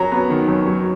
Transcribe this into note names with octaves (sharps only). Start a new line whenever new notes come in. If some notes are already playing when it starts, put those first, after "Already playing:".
Already playing: F#2 F#3 A#5
B3
D#3
F#2
F#3